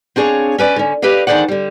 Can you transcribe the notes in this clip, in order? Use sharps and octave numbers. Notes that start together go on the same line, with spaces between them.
C4 D4 G#4 C#5 F5
C#4 B4 D5 D#5
D3 C#4
G4 B4 D5 D#5 F5
D2 D#3 G#4 C5 D5 F#5
D3 G3